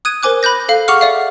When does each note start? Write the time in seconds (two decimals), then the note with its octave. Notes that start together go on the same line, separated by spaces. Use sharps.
0.05 D#6 F#6 G#6 D#7
0.23 A#4 C5 G#5 D6 F#6
0.43 B5 F#6 G6 A#6
0.69 A4 F5
0.88 G#4 F#5 C#6 D6 F6
1.01 D5 E5 F5